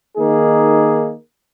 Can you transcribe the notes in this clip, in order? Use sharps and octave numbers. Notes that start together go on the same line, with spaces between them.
D#3 A#3 D#4 G#4